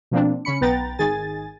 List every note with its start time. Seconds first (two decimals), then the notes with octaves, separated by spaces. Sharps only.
0.11 B2 F3 A#3 C4 D4
0.45 C#3 C#4 B5 C#7
0.61 B1 B3 B4 G5 A#5 A6
0.99 G#1 D#3 G#4 G#5 A6